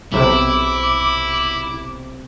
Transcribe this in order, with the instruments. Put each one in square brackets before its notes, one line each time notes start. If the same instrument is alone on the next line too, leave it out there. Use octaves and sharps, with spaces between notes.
[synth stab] B1 C3 [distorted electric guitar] E4 [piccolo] D6